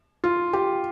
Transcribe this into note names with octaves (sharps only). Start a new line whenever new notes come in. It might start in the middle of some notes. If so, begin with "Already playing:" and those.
F4
G4